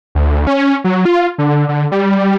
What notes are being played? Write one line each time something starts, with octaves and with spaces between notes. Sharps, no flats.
D2
C#4
F#3
F4
D3
D3
G3